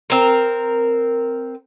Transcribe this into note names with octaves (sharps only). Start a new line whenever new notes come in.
C4 A#4